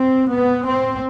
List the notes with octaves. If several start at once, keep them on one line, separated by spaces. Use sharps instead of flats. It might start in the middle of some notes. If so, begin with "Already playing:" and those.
Already playing: C4
B3
C4